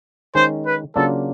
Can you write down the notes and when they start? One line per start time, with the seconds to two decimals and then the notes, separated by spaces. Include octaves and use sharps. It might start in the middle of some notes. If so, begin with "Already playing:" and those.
0.35 D#3 G#3 C#4 C5
0.66 B4
0.96 C#3 F#3 A#3 D4 F4 A4